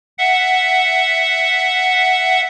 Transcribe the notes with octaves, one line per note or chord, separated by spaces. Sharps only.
E5 F#5